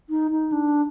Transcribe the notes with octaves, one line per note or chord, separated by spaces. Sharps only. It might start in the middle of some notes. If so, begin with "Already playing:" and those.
D#4
D#4
D4